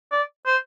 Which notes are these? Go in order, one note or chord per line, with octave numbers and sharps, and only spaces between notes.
D5
C5